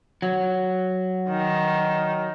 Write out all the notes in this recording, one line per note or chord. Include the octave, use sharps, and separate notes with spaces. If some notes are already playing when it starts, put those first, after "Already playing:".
F#3
D#3